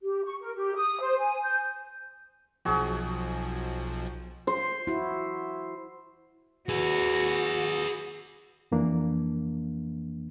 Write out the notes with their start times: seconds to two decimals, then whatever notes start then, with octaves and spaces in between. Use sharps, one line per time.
0.03 G4
0.24 C#6
0.41 A#4
0.55 G4
0.75 D#6
1.00 C5
1.19 G#5
1.43 G6
2.65 B1 B2 F3 F#4 G#4
4.47 C5
4.87 E4 F#4
6.69 F#4 G#4 B4
8.72 F2 E3 A#3 D4